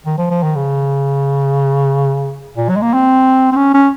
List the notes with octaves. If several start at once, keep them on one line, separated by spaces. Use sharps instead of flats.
D#3
F3
F3
D#3
C#3
A#2
F#3
G#3
A#3
C4
C4
C#4
C#4